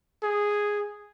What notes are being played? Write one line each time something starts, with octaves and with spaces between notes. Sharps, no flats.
G#4